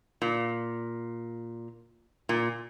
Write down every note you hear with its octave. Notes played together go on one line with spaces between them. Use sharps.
A#2
A#2